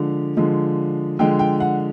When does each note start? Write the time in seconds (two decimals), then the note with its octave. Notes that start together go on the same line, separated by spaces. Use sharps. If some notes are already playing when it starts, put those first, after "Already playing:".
Already playing: D3 F3 G#3
0.37 D3 F3 G#3
1.19 D3 F3 G#3 G5
1.39 G5
1.60 F#5